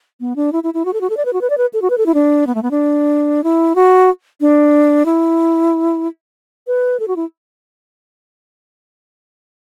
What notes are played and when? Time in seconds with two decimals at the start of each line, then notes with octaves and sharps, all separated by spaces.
0.20 B3
0.36 D4
0.53 E4
0.63 E4
0.74 E4
0.85 F#4
0.93 A4
1.01 F#4
1.10 A4
1.17 D5
1.25 B4
1.33 F#4
1.41 B4
1.50 D5
1.58 B4
1.73 A4
1.82 F#4
1.90 B4
1.98 A4
2.06 E4
2.14 D4
2.47 B3
2.55 A3
2.63 B3
2.71 D4
3.44 E4
3.75 F#4
4.41 D4
5.06 E4
6.67 B4
7.00 A4
7.08 F#4
7.16 E4